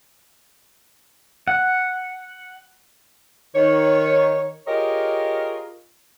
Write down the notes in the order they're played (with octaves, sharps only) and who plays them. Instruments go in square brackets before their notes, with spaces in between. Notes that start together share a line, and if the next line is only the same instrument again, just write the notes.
[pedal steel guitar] F#5
[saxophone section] D#3 C#5
F4 G4 G#4 A#4 C#5 D#5